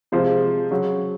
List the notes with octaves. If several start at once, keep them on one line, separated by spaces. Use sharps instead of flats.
C3 F3 G#3 C5
C#3 F#3